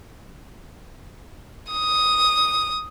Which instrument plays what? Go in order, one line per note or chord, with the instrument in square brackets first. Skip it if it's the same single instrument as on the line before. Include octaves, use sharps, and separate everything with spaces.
[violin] D#6